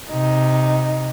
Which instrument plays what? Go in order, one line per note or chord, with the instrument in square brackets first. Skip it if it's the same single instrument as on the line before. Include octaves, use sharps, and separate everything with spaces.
[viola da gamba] C3 [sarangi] D#4